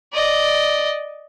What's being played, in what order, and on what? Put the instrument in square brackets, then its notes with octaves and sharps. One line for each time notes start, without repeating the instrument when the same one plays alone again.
[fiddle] D5 D#5